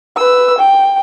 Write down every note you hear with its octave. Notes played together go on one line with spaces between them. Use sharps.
B4 E6
G5